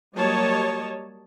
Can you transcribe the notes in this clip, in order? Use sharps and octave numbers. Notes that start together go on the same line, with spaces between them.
F#3 G3 A#3 C#5 D#5 A5